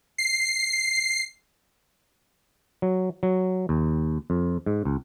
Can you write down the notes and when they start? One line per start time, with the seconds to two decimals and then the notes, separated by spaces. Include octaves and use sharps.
0.18 C7
2.82 F#3
3.23 F#3
3.69 D#2
4.30 F2
4.66 G#2
4.85 C#2